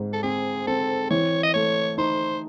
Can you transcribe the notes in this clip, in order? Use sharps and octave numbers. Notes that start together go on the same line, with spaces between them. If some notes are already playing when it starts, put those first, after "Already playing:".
Already playing: G#2 C4
A4
C4 G#4
C4 A4
E3 C#5
D#5
A3 C#5
D#4 C5